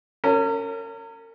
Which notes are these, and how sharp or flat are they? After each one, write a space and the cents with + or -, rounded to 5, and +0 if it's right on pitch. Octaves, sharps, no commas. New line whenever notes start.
C#4 +0 A#4 -40